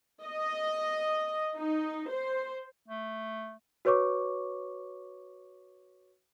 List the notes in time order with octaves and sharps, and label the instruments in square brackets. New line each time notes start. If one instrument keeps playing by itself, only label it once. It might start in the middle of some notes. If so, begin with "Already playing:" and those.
[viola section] D#5
D#4
C5
[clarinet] A3
[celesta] F#4 B4 C#5 C#6 D6